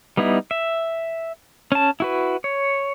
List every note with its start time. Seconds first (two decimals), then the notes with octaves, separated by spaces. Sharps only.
0.17 G3 B3 D#4 E4
0.51 E5
1.72 C#4 A5
2.00 E4 F#4 B4
2.44 C#5